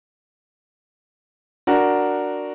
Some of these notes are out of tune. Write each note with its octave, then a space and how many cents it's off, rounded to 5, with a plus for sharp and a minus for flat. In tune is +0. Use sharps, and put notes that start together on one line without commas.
D4 +5 F#4 +0 A#4 +0